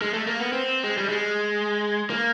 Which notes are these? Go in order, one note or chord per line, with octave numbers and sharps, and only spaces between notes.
G#3
A3
A#3
B3
C4
G#3
G3
G#3
A#3